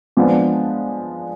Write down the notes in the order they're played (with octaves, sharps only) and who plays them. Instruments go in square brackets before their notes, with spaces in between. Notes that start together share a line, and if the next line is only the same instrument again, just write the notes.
[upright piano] F3 G#3 B3 D4